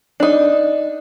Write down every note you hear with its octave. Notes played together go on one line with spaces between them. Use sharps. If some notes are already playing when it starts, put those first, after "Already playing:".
D4 D#4